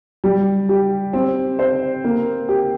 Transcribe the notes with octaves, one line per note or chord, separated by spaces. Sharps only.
G3
G4
C4
C5
A#3
G4